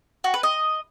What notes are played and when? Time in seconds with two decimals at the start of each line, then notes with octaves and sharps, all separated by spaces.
0.24 F#4
0.34 B4
0.43 D#5